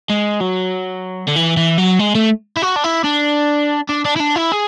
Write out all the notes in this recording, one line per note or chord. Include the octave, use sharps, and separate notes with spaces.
G#3
F#3
D3
E3
E3
F#3
G#3
A3
E4
F#4
D4
E4
D4
D4
D4
E4
D4
E4
G#4